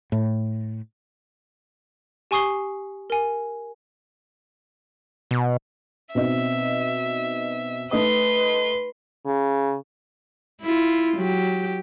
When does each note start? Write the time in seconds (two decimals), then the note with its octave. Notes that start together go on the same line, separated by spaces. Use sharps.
0.12 A2
2.31 G4 G#5 C#6 D#6 C7 G7
3.10 A#4 G#5
5.31 B2
6.15 B2 C4 D#4 E5
7.91 A3 D#4 B4 C6 D#6
9.25 C#3
10.62 E4 F4
11.17 F#3 G4